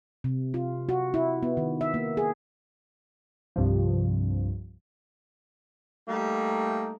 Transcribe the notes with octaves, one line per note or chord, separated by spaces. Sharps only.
C3
F4
F#4
E4
B3
D#3
E5
A#3
G#4
C2 G2 C3 F3
G3 A3 A#3 D#4